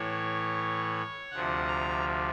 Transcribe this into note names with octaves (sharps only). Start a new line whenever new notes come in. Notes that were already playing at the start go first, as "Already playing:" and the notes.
Already playing: A2 E3 C#5
D2 C3 F3 F#5
A#5